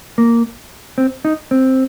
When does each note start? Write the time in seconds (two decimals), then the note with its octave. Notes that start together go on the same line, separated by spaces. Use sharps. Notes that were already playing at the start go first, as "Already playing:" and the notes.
0.18 A#3
0.98 C4
1.25 D#4
1.51 C4